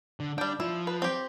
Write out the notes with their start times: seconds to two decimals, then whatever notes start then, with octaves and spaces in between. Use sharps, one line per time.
0.20 D3
0.38 G3 D4 G5
0.60 F3 E4
0.87 B4
1.02 C4 G4